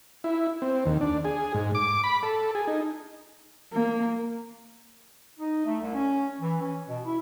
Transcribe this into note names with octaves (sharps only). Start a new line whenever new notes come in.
E4
C4
D#2
D4
G#4
G#2
D6
B5
A4
G#4
D#4
A#3
D#4
A3
C2
C#4
E3
C#4
B2
E4